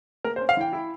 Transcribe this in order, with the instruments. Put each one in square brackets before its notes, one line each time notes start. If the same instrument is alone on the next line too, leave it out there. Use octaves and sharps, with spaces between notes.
[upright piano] A#3 A#4
C5
C#4
F5
E3 G5
E4